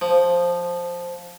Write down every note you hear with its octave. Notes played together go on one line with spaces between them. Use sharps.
F3